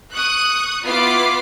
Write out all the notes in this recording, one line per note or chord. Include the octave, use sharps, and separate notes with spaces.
C#6 D#6 F#6
B3 E4 F4 B5 D6 C7